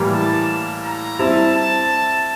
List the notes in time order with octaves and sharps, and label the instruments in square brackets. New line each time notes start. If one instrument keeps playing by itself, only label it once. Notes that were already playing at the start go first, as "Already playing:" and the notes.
Already playing: [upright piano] A2 E3 G3 A#3
[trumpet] A5
A#5
[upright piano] G3 C4 E4 [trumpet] A5
[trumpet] A5